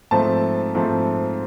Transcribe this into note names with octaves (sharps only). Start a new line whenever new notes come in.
G#2 F3 A3 C4 A5
G#2 F3 A3 C4